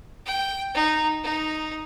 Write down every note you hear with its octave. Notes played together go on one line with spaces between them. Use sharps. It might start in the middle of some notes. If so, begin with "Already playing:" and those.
G5
D#4
D#4